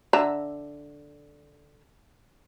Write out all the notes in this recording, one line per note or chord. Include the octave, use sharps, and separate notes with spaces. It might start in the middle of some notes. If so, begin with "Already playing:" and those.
D3 E5 A#5